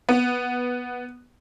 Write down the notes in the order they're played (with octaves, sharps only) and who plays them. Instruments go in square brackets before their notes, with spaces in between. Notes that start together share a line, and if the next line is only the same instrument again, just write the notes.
[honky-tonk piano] B3